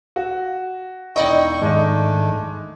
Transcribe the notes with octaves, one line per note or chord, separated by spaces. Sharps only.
F#4
E1 D#4 E4 D5 D#5 G5 C#6
G#2 D#3 G#3 A3 D4 D#4